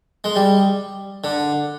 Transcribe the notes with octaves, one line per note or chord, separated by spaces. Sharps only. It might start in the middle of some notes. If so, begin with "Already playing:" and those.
G#3
G3
D3